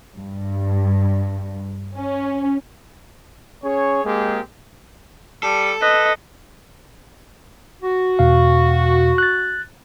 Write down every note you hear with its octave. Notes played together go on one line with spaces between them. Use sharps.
G2
C#4
C#4 G#4 C#5
G#3 A#3 C4 G4 G#4
G3 A4
B4 D#5
F#4
E2 B2 F5
F#6 A6